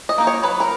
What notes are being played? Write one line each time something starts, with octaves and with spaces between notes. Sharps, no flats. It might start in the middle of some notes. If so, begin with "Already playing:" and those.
D#5
A#3 D#4
C#5
F#3 B4
A#4